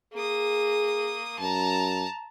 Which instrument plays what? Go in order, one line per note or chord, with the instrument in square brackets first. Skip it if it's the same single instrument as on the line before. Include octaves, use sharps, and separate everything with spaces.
[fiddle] A#3 D#6 [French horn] G#4
[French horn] F#2 [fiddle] A5 A#5